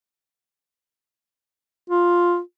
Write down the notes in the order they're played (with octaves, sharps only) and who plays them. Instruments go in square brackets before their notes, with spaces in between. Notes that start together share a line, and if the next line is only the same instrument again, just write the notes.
[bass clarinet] F4